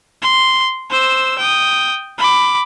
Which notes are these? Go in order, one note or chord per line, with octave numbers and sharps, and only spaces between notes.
C6
C5 E6
G5 D#6
B5 D6